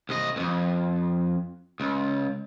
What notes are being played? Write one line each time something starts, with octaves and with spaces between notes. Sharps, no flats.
C2 D#5
C2 F2
C#2